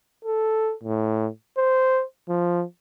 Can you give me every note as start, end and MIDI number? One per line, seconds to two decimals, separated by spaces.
0.25 0.73 69
0.84 1.28 45
1.57 2.03 72
2.29 2.64 53